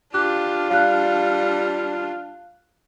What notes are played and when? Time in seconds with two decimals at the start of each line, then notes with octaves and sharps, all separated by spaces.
0.14 D4 F4 G4 F#6
0.70 G3 F5 F#6